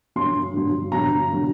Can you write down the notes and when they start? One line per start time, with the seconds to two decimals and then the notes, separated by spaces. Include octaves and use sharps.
0.16 G2 F#3 C6
0.54 G2 F#3
0.92 G2 D3 F#3 A#5
1.32 D3 F#3